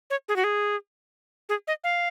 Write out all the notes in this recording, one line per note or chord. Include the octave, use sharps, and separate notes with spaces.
C#5
G#4
F#4
G#4
G#4
D#5
F5